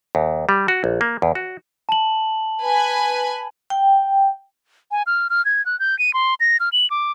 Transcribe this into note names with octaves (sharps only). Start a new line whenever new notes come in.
D#2
G3
F#4
A#1
A#3
E2
F#4
A5 F#7
B4 G#5 B5
G5
G#5
F6
F6
G#6
F#6
G6
D#7
C6
A#6
F6
F#7
D6